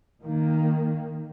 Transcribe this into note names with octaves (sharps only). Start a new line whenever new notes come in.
D#3 A#3